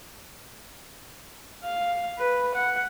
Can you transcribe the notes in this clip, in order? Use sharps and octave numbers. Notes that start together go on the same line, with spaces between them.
F5
B4
F#5